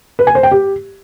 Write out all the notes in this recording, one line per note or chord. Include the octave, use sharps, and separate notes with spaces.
B4
G#5
C5
G5
G4